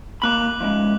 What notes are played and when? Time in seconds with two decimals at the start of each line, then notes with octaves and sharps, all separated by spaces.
0.22 D#2 A#3 B5 D6 F#6 F#7
0.60 F3 G#3 C#4